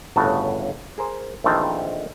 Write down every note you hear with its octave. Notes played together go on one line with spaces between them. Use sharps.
G1 A2 C#3 F#4 A5
G#4 A#4 C5
A#1 D#3 E3 A3 C4 A5